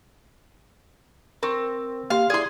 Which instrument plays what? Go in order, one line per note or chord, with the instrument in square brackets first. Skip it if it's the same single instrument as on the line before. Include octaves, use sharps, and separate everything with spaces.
[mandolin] C4 [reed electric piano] A#4 C#6
[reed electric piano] A#3 G4 C6 [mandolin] F5
[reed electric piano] E4 D5 [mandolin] G#4 C6